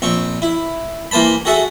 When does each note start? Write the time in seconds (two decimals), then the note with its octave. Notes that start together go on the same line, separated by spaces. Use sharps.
0.02 A#1 C4 C#6
0.42 E4
1.11 E3 A#3 C5 A5 B5
1.45 F#4 G#4 A4 E5 F#5